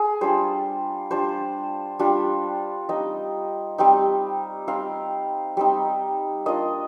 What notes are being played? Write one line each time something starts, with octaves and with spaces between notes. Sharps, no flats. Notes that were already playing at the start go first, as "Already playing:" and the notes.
Already playing: G#4
G3 D4 F4 C5
G3 D4 F4 C5
G3 D4 F4
G3 C4 D#4 D#5
G3 C4 D#4
G3 C4 D#4 F5
G3 C4 D#4
A#3 D4 F4 D#5